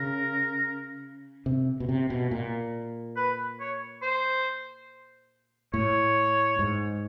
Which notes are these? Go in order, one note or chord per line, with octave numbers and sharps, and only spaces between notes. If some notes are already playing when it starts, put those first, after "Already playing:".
Already playing: C#3 A#4
C3
B2
C3
B2
A#2
B4
C#5
C5
A2 C#5
G#2